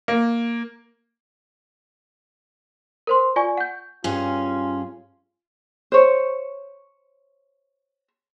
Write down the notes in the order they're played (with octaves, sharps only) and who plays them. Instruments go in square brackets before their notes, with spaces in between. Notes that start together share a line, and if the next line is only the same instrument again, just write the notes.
[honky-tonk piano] A#3
[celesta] A#4 C5 C6
F4 D5 G#5 C#6
F#5 G6
[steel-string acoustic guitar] G2 C#4 G#4 [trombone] F4
[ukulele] C5 C#5